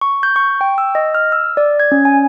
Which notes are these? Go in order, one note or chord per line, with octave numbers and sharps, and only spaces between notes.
C#6
G6
C#6
G5
E6
D#5
F6
E6
D5
G#6
C#4
G#5